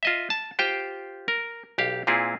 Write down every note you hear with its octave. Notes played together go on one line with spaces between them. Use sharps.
F4 D#5 E5
A5
F4 G4 C5 G5
A#4
B1 G4 F5
A#2 C4 E4 F4 G#4